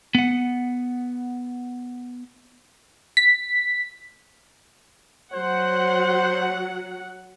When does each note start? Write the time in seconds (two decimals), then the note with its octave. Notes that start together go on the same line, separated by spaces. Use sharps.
0.15 B3 F#5
3.17 B6
5.33 F#3 C5 F#5